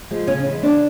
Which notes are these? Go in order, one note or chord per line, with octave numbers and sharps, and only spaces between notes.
F3 G#3
C#3 C#4
E3 G#3
C#3 D4